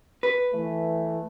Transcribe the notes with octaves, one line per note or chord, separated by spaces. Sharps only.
B4
E3 A3